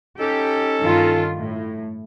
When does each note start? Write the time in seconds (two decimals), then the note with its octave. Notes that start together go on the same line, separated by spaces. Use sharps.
0.20 C#4 D#4 G4 A4
0.81 G2 D#3 F4
1.38 A2